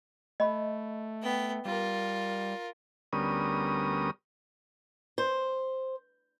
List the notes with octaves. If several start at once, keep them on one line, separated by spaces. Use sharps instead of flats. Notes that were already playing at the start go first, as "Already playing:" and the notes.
A3 D#5 B5
B3 G5
G3 F4 A#4
D2 G3 B3 C#4 A#4 D#6
C5